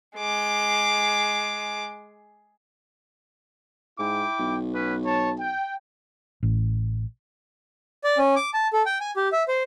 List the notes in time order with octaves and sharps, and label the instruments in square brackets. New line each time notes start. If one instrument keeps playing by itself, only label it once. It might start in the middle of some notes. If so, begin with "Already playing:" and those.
[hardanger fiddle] G#3 D6
[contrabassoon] G#2 [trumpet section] E4 G5 D6
[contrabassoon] B1
[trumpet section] B3 C#4 B4
C#5 A5
G5
[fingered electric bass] A1
[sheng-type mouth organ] D5
C#4
D6
A5
A4
G5
G#5
G4
E5
C5